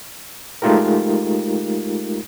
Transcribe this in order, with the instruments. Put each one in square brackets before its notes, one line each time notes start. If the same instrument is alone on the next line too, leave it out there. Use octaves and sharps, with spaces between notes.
[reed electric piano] G#3 A3 D#4 F4 G4 A#4